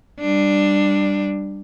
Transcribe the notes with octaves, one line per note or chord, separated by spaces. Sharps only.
G3 D4